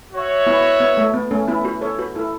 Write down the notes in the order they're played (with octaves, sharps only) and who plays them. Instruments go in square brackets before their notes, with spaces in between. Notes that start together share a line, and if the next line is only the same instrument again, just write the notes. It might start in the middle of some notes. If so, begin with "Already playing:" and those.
[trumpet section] F#4 C#5 E5
[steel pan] B3 E4
B3
A3
B3
A3 C#4
B3 E4
F#4 B4
A4 C#5
F#4 B4
E4 A4